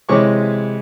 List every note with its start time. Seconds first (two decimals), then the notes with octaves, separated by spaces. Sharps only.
0.09 C3 E3 G#3 C#5 C#6 D6